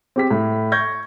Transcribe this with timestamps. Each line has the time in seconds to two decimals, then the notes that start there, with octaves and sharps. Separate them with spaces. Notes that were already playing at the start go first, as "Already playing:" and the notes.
0.16 C4 G4 B6
0.31 A2
0.72 C#6 G6 G#6 A#6